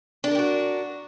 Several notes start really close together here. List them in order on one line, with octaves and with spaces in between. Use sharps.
D4 A4 A#4 G4 F#4